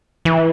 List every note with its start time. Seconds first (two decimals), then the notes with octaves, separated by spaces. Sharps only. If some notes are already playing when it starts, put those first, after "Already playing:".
0.25 E3